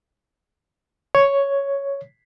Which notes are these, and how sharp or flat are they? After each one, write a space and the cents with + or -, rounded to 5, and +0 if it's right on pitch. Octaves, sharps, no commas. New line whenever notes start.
C#5 +5